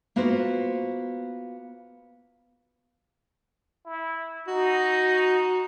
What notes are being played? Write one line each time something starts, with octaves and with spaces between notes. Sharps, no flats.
A#3 B3 F4 F#4 B4 C5
E4
D#4 F#4